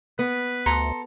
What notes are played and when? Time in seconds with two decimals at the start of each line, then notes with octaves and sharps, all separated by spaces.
0.19 B3 B4
0.66 D2 A4 A#5 C6